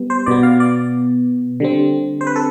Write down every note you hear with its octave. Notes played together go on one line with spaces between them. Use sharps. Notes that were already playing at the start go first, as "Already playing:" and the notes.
Already playing: G3 B3
C5
B2 B3 D5
F5
D5
D3 G3 C4
C5
B4
A4